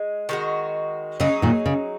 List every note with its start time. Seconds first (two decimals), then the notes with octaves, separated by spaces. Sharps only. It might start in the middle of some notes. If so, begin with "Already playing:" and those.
Already playing: G#3
0.29 D#3 G#3 F#4
1.20 C#3 F#3 D#4 G#4
1.42 A#2 D#3
1.66 C#3